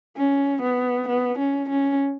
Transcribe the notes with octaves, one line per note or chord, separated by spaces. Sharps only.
C#4
B3
B3
C#4
C#4